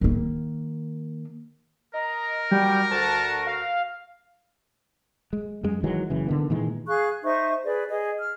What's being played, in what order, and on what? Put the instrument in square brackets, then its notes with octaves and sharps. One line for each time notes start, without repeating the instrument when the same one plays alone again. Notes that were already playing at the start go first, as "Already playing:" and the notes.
[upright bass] D#3 A#3
[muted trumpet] A#4 [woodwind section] D#5 A#5
[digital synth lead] G3 [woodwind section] F#4 G4 G5
[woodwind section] D2 F#4 [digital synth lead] A5
[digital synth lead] F5
[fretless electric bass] G#3
F#2 G#3
D#3 E3 F#3 G#3
F#1 C#3 E3
D3 D#3 B3
A#2 D#3 E3 G#3
[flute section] G#4 F5 C#6 F#6
D#4 C5 E5 C#6
G#4 B4 D5
G#4 D#5
F6